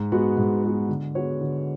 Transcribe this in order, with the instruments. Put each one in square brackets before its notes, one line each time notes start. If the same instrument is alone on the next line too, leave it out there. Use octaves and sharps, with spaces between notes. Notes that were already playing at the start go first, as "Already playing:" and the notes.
Already playing: [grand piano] G#2
G#3 B3 F#4
G#2
G#3 B3 F#4
D3
G#3 B3 F#4 C#5
D3